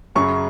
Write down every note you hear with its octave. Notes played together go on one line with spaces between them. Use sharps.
F#2 C#3 F#3 C#6